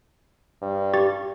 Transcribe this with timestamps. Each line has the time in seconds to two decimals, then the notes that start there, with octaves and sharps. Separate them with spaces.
0.62 G2
0.94 G4 C#6 A6